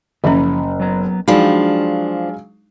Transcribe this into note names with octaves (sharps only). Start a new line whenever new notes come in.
F#1 F3 F#3 C#4 E5 B5
F#3 B3 A#5
F3 F#3 G#3 D4 D#4 F5 G5 B5